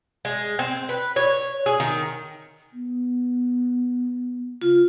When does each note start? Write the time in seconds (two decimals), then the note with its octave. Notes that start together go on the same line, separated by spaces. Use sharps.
0.25 G#3
0.59 C4
0.89 B4
1.16 C#5
1.66 G#4
1.80 D#3
2.73 B3
4.62 C#3 F4